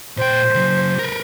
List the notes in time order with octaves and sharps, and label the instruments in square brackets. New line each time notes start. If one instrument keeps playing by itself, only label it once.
[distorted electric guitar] A#2 G5 [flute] C5
[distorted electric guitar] C#3 F#3
A#4 B4